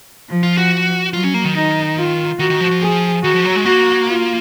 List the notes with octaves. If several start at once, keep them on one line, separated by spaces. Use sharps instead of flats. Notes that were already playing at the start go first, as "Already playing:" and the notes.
F3
F4
F#4
F#3 F4
C#4
A#3
D#3
D#4
F4
D#3 F#4
D#3
F3
F3
G#4
D#3 F#4
F3
F#3
G#3
A#3 F#4
F4